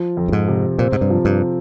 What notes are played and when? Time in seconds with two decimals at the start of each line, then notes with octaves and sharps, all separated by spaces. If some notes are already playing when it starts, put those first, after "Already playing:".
Already playing: F3
0.17 F2
0.28 G2
0.32 G#2
0.48 C3
0.79 A#2 C4
0.92 G#2
1.01 G2
1.10 F3
1.25 G2